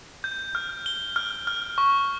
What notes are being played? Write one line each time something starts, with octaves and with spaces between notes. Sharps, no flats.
G6
F6
G7
F6
F6
C#6